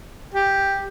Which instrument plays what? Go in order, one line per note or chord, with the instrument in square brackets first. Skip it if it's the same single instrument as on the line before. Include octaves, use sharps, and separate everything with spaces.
[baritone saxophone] G4